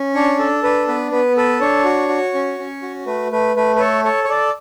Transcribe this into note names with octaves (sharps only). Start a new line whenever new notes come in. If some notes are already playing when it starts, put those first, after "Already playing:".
Already playing: C#4
D4 C#5
A4
D4 B4
B3 B4
B3 B4
A4 B4
D4 C#5
F#4
F#4
C#4
C#4
F#4
A3 B4
A3 B4
A3 B4
B4
A4 C#5
A4 C#5
C#5
A4 D5